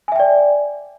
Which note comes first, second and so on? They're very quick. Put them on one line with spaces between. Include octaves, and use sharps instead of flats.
G#5 E5 G5 D5